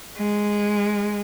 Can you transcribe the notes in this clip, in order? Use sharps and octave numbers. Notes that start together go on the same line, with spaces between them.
G#3